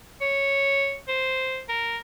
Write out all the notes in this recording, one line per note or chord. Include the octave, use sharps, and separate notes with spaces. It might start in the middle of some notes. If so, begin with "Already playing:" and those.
C#5
C5
A#4